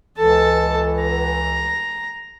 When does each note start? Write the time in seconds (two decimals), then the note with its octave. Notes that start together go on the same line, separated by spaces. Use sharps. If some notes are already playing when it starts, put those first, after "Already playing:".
0.18 C#2 E3 A4 A5
1.02 A#5